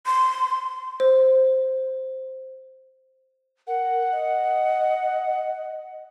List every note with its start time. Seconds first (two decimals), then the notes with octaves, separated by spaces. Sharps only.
0.06 C6
1.00 C5
3.67 A#4 F#5
4.12 D#5